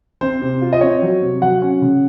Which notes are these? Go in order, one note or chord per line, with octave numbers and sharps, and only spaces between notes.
C4 C5
C3
F4
D#5
C4 C#5
F#3
C3
F#3 F#5
C#4
C#3